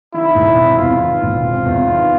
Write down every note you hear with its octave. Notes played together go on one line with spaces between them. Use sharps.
D#3 E4
E1
C3
E2 F4
D#3
E1
C3
E2
D#3